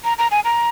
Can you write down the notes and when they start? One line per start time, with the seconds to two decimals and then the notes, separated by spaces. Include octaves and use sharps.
0.04 A#5
0.18 A#5
0.31 G#5
0.44 A#5